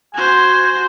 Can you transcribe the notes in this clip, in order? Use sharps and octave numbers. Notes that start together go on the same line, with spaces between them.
F#4 C5 G#5